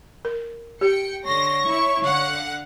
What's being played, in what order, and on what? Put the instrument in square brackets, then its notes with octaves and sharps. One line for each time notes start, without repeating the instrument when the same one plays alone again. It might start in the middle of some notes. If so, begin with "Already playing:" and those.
[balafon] A#4
[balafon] G4 [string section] G5 C#7
[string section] D3 C6 A#6 [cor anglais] C#5
[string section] E4 C#6
D3 F5 F#5